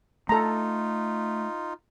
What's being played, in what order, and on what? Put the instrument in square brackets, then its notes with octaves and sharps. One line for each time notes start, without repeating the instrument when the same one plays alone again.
[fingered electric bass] A3 [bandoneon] D#4 F4 [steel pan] A4 A#5